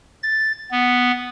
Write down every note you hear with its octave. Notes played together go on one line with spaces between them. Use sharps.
A6
B3